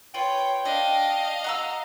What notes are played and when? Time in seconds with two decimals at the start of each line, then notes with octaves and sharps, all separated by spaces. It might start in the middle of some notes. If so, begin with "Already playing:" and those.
0.14 F4 B4 C#5 G5
0.65 D4 D#5 F5
1.44 F#4 A#5 E6